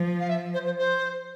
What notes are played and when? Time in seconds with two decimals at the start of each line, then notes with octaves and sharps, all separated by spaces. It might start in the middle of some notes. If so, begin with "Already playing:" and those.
Already playing: F3
0.20 F5
0.29 E5
0.54 C5
0.66 C5
0.78 C5